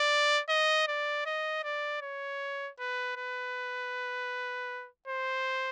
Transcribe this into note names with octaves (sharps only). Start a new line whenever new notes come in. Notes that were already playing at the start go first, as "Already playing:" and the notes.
Already playing: D5
D#5
D5
D#5
D5
C#5
B4
B4
C5